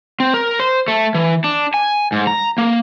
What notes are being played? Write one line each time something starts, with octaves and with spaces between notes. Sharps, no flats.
C4
A#4
C5
A3
E3
D4
G#5
G#2
A#5
A#3